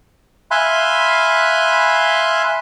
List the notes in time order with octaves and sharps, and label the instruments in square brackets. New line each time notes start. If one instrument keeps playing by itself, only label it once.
[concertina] E5 F5 G#5 B5 C6 F#6